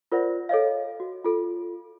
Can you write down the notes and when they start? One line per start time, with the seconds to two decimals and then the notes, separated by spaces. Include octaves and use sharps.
0.12 F4 A#4 C5 D5 F#5 A#6
0.49 A4 C#5 D#5 F5
1.00 F#4
1.24 F4 A4